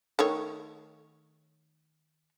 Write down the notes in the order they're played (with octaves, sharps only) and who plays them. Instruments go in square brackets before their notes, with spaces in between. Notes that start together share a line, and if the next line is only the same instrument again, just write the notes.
[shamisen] D#3 A3 C#5